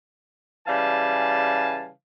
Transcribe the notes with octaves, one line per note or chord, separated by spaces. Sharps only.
C#3 E3 G3 F5 G#5 A5